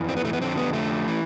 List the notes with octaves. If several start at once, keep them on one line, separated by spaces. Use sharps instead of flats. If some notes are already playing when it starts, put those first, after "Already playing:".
Already playing: F2 E3
C4
B3
A3
B3
F2 D3 F3 C4
B3
A3
E3